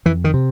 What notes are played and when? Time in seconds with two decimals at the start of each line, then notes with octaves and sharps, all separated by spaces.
0.05 F2 E3
0.24 D#3
0.34 C3